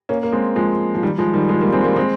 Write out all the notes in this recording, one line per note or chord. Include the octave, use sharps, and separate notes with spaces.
A#3 C#4
A#3
G#3 C4
F3 G#3
F3
D#3 G3
F3 G#3
D#3 G3
F3 G#3
G3 A#3
G#3 C4
G3 A#3
G#3 C4